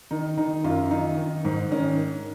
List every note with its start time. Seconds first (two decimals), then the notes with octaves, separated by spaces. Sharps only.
0.11 D#3 D#4
0.38 D#3 D#4
0.64 F#2 F4
0.91 D#3 D#4
1.18 D#3
1.45 G#2
1.71 D#3 C#4